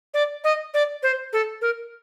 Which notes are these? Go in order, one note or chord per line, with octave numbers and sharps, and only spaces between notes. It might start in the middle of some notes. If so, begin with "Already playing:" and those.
D5
D#5
D5
C5
A4
A#4